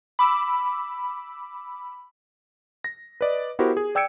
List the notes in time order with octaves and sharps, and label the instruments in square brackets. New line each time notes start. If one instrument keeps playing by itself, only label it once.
[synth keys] B5 D6 E6
[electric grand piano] A#6
B4 D5 D#5
B3 E4 F#4 G4 A#4 C5
G#4
D5 G5 E6 G#6 C#7 D7